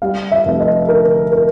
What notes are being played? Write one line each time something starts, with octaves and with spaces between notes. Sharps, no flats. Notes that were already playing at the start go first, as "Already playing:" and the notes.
G3 F5
E5
F1
D#5
D3 A#4
A#4